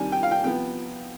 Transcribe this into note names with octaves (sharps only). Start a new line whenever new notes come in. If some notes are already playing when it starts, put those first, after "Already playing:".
Already playing: C3 D#3 G3 D4 G#5
G5
F5
G5
C3 F3 B3 G5